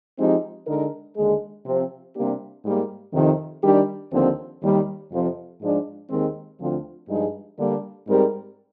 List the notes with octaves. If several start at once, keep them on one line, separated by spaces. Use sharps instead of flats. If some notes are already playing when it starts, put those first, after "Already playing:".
F3 G#3 C4 D#4 G4
D3 G#3 D#4 A#4
D#2 D3 G#3
C3 F3 C4
C3 G3 A#3 D4 G4
G#2 G3 A#3
F2 C3 D#3
D#3 G3 D4 G4
D#2 D3 F3 C4
D#2 D#3 G3
F2 C3 F3 C4
G#2 F3 G#3 D4
D#2 D#3 G#3 C4
D2 D3 F3 C4 F4
G2 F3 G#3 D#4 G#4
D3 G3 A#3 D4
G#2 G3 C4 G4 A#4